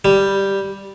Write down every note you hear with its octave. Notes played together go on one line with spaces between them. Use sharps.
G3